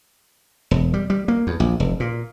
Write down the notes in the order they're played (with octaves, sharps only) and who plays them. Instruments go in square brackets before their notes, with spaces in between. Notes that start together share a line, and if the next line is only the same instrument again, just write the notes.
[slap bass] E1
G3
G3
A#3
E2
A#1
F1
A#2